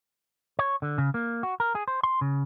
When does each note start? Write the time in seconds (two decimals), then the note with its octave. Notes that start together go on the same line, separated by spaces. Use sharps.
0.59 C#5
0.82 D3
0.98 C#3
1.14 A#3
1.43 F#4
1.60 A#4
1.75 G#4
1.88 C5
2.03 C6
2.21 C#3